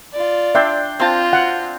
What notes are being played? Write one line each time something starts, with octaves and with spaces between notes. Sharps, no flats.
F4 D5
D4 E5 G5 C6
C4 F4 A5
F#5